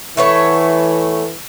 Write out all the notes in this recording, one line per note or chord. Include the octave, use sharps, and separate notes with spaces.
E3 A3 B3 C#5